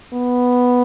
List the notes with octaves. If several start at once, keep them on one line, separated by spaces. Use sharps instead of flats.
B3